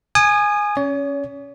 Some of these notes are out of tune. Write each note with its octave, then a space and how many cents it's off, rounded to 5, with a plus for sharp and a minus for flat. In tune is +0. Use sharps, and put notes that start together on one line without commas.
G#5 +0 D#6 -30
C#4 +0 C#5 +35